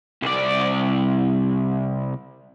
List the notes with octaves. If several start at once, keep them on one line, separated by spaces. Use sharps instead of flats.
C2 D5